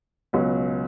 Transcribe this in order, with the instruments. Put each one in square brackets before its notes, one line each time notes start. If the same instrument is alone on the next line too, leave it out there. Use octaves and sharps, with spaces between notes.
[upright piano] C#2 B2 F#3 C#4